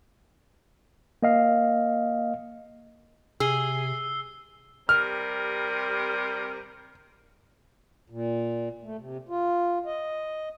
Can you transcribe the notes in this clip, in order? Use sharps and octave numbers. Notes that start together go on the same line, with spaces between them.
A#3 D#5 F5
C3 G#4 E6 C7 G7
C3 G3 A#4 F6
A#2
A3
C3
F4
D#5